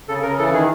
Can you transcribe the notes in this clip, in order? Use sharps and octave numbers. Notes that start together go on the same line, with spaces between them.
C#3 A4
C#3 A#4
E3 A4
D#3 G#4